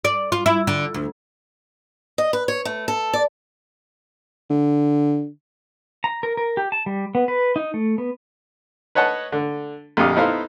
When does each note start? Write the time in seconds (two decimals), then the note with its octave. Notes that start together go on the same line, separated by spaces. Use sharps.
0.05 D5
0.32 F4
0.46 E4
0.67 D3
0.94 D2
2.18 D#5
2.33 B4
2.48 C#5
2.65 A3
2.88 A4
3.13 D5
4.50 D3
6.04 A#5
6.23 A#4
6.37 A#4
6.57 G4
6.72 A5
6.86 G3
7.15 B3
7.28 B4
7.56 D#4
7.74 A3
7.98 B3
8.95 B4 C#5 D#5 F#5 A5
9.32 D3
9.97 A#1 F2 D3 G4 F5 D#6
10.16 B3 D#4 E4 A4 C5 F5